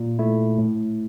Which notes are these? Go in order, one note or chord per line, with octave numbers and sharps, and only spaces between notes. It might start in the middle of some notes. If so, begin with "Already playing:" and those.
Already playing: A#2
A3 E4
A2